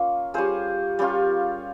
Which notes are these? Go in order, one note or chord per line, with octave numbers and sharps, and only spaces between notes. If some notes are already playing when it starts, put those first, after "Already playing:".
Already playing: A#3 C#4 F4
G3 C#4 F4 G#4 C5
G3 C#4 F4